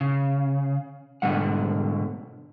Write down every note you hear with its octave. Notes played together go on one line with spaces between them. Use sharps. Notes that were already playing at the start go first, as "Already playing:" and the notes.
C#3
G#2 B2 D3 G3 F#5